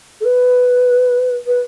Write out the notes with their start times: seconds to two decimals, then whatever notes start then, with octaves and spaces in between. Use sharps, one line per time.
0.20 A4
0.24 B4
1.46 B4